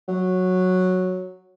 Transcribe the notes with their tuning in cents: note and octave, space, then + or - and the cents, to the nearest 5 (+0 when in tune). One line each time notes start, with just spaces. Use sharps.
F#3 -5